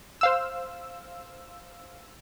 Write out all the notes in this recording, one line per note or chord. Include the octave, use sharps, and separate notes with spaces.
C5 F5 E6